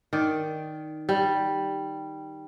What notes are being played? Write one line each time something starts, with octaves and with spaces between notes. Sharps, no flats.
D#3 D5
G3